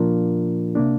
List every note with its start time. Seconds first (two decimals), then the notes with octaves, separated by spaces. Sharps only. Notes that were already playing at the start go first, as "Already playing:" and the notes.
Already playing: A#2 F3 A#3 D4 F4 A#4
0.75 C3 A#3 D4